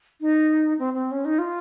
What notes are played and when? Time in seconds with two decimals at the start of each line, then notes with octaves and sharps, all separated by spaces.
0.21 D#4
0.79 C4
0.94 C4
1.11 C#4
1.25 D#4
1.39 F4